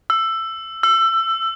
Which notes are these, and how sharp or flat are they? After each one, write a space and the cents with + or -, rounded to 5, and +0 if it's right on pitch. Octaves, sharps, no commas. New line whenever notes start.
E6 +15
E6 +25